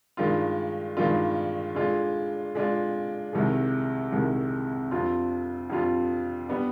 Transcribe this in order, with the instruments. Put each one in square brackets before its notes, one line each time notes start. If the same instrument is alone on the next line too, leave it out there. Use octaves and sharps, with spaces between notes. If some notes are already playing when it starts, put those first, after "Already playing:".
[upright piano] G2 D#3 G#3 D4 F4
G2 D#3 G#3 D4 F4
D3 G#3 D4 F4
D3 G#3 D4 F4
C2 C3 D#3 G#3
C2 C3 D#3 G#3
F2 D3 G3 C4 F4
F2 D3 G3 C4 F4
G3 B3 D4